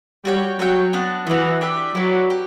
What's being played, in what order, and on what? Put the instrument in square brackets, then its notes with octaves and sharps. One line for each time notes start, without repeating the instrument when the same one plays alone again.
[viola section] G3 [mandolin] F#4 C#5 G5
[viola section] F#3 [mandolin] F#4 C#5 E5 G5
[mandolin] B3 D4 F#4
[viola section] E3 [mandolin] B3 D4 F#4
[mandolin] D4 G4 B4 E5
[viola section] F#3 [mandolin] E4 B4 D5
[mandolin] G4